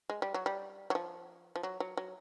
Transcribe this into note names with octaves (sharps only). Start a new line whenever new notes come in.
G#3
G3
F#3
G3
F#3
F3
F3
F#3
F#3
F#3